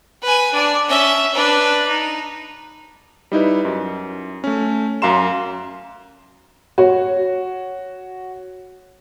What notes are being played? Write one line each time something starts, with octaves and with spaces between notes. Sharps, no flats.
B4 G#5
D4 D5
C#4 E5
D4 B4
D#4
G3 D#4 E4 B4
F#2
A3 C#4
F#2 F5 A#5 C6 E7
F#4 C#5